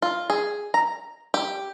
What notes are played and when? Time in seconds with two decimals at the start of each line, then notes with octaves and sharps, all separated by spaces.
0.02 F4
0.30 G#4
0.74 A#5
1.34 G4